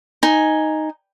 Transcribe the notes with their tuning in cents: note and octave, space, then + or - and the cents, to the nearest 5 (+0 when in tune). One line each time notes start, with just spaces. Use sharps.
D#4 +0 G#5 +0